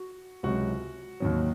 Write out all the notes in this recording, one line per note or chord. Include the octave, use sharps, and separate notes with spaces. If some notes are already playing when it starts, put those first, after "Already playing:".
Already playing: F#4
C#2 C3 F#3 F#4
D#2 D#3 F#3